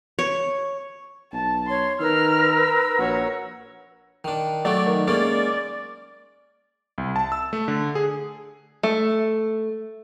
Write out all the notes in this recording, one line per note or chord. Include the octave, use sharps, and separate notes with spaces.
C#5
B1 A5
C#5 C6
D#3 A#4 B4 E6 F6
A#1 F#4 C#5
D#3 D4
F#3 A3 D4 D5
D#3
G#3 A#3 C#4 D5
C2
A5
E6
A3
D3
G#4
A3